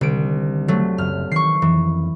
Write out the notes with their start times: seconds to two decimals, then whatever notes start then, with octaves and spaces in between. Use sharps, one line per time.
0.01 C2 D3 D#3 G3 D7
0.68 F#3 A3
0.98 F#1 F#2 F6
1.32 D#3 E3 C#6 C7
1.62 F2 D#3 E3